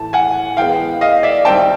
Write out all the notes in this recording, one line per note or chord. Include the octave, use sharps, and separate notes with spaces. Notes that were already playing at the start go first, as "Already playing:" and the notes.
Already playing: A2 E3 A3 A5
F#5 G#5
E3 G#3 B3 F5 G5
D#5 F5
D5 E5
D#3 G3 C4 G5 A5